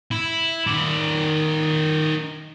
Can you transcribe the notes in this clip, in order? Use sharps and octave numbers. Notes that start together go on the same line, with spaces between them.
E4
D#3 D5